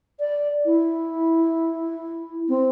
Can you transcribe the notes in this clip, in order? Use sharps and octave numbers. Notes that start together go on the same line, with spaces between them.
D5
E4
C4